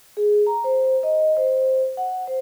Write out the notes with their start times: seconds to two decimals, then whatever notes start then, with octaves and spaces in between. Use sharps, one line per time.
0.17 G#4
0.47 A#5
0.64 C5
1.03 D#5
1.37 C5
1.97 F#5
2.27 C5